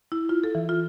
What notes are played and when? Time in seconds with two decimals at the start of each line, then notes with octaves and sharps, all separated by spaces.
0.12 E4
0.29 F4
0.44 A4
0.55 E3
0.69 F4